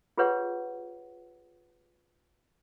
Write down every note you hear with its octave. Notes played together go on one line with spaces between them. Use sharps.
F4 G4 G#4 B4 C#5 F#5